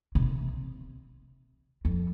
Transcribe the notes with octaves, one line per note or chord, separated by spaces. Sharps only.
C3
F2